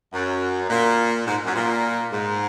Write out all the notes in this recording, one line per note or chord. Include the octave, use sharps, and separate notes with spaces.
F#2
A#2
G#2
F#2
A#2
G#2